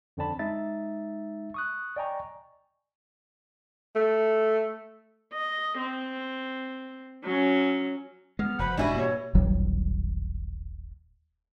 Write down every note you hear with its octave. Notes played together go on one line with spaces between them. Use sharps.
F2 D3 C4 D5 A5 B5
G#3 D#4 E5 A6
C#6 D#6 F#6
D5 D#5 G5 G#5 A#5 C#6
A3
D#5
C4
F#3 C#4
G#3 B3 F6
F1 F#4 C5 F#5 B5
E1 G#2 B2 G3 D4 E4 F#4 G#5
A#3 C#5
D#1 A1 F#3 G3